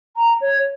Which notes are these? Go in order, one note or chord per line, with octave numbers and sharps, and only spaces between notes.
A#5
C#5